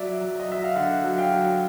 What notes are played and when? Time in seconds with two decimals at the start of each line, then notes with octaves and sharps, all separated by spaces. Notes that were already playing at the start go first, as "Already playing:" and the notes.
Already playing: F#3 D5 E5
0.21 F#3
0.40 D#5
0.48 F#3 E5
0.64 F5
0.76 D3 E5 F#5
1.04 F#3
1.18 F5 G5
1.32 F#3